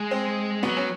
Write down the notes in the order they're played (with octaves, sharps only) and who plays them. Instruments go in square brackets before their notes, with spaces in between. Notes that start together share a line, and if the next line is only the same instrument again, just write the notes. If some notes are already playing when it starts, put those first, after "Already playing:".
Already playing: [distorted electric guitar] G#3
[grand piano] C4
[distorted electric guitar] F#3 [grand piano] B3
[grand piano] C#4